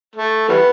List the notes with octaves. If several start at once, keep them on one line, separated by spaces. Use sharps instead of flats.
A3
E3 G3 B3